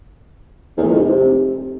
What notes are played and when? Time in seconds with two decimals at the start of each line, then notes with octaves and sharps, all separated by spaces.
0.78 E2
0.83 A2
0.89 F2
0.94 G#2
0.99 C3